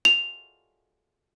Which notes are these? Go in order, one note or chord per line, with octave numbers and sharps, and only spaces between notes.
F7